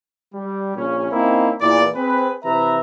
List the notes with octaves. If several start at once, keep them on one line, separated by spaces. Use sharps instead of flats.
G3
A#1 A#2 C#3 C#4
A#3 C4 C#4 D#4 E4
E2 A#2 E3 A#3 D5
C4 G#4 B4
C3 E3 B4 E5 A#5